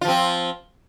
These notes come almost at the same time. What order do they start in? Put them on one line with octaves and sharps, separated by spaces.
F4 F3 C4